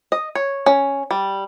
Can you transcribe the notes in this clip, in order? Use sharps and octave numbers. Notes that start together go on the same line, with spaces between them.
D#5
C#5
C#4
G3